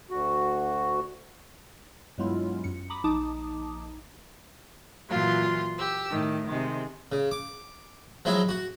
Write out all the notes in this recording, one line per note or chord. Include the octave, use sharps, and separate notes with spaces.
D2 F#4
G2 F#3 G#3 B3 E4 F4
F#2 C#7
A#5 B5 D6 D#6
A#1 D#4 A5 D6 D#6
A#2 E3 F#3 F4 C6
G4 E6
A2 D#3
C3 D#3 G#3
C#3
D6
F3 F#3 G#3 E4
F#4